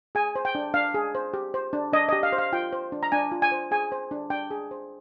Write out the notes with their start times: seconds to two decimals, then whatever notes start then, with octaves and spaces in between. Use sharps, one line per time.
0.15 G#4 G#5
0.36 C5
0.45 G5
0.55 D4
0.74 D4 F5
0.94 G#4
1.15 C5
1.34 G4
1.54 C5
1.73 D4
1.93 D4 D#5
2.09 G4 D#5
2.23 F5
2.33 C5
2.38 F5
2.53 F4 G5
2.73 C5
2.92 D4
3.03 A#5
3.12 D4 G#5
3.32 F4
3.42 G#5
3.52 C5
3.71 G#4 G#5
3.92 C5
4.11 D4
4.30 D4 G5
4.51 G#4
4.71 C5